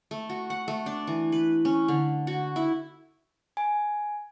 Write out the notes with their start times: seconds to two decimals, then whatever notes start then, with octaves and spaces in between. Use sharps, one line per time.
0.11 A3
0.29 F#4
0.50 F#5
0.68 A3
0.86 D4
1.07 E3
1.32 B4
1.65 C#4
1.88 D3
2.27 F#4
2.56 E4
3.57 G#5